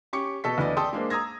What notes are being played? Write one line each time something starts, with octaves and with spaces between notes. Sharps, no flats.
C#4 G4 C#6 D6 C#7
B2 A4 D#5 C#6 B6
D2 E3 B3 D5 D#5
A4 D5 G5 C6 D#6
G#3 A#3 D4 C5
A#5 D#6 E6 G#6 A#6